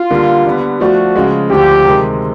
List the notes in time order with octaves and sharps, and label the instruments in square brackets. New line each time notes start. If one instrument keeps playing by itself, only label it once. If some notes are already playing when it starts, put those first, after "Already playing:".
Already playing: [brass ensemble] F4
[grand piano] D3 G3 A#3
D3 G3 B3
[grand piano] F3 A3 D4 [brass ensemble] F#4
[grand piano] C#3 F3 G#3
[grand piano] D2 D3 F3 [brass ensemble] G4
[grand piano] C3 D#3 G#3